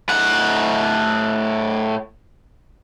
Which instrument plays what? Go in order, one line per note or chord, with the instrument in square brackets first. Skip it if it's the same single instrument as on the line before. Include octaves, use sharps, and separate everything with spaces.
[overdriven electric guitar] A2 F#5